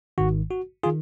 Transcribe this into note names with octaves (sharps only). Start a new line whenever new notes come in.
G#1 G#2 D#3 F#4
F#4
F4 G#4
D#3